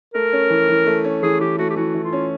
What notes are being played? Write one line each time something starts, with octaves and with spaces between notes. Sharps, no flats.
A3 A#4
C#4
E3
E3
A3
C#4
E3 G#4
E3 G4
A3 F#4
G4
E3 F#4
E3
F4
C#4